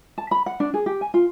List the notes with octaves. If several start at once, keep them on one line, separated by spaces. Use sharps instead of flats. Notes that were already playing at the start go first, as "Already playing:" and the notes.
A5
B5
F#5
D4
G#4
G4
G#5
F4